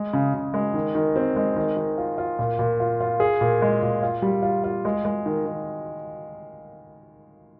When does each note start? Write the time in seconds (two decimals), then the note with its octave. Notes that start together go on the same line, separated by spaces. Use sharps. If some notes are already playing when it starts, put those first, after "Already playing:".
Already playing: G#3
0.13 C#3
0.34 C#3
0.54 G#3
0.74 D#3
0.95 D#3
1.16 C4
1.36 G#3
1.56 D#3
1.77 D#3
1.98 F4
2.18 F4
2.39 A#2
2.59 A#2
2.80 F4
3.01 F4
3.20 G#4
3.41 A#2
3.62 G#3
3.82 A#2
4.03 F4
4.22 G3
4.43 F4
4.64 F4
4.85 G#3
5.05 G#3
5.26 D#3
5.46 D#3